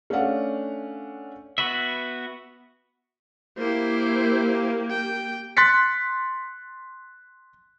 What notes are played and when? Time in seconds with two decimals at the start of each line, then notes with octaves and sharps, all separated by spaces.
0.10 A3 C#4 D4 C#5 F5 F#5
1.58 B3 F#4 B4 E5
3.58 A#3 E4 G4 C5
4.90 G5
5.57 C6 F#6 A6 B6 C#7